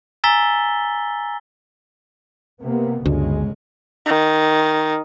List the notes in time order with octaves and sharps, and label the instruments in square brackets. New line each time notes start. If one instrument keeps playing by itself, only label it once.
[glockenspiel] G#5 A#5 E6 A6 B6 G7
[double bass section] C3 A#3 B3
[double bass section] G1 C#3 G#3 [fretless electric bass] D2
[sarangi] D#3